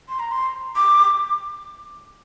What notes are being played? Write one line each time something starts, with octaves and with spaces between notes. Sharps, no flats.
C6
A#5
C6
D6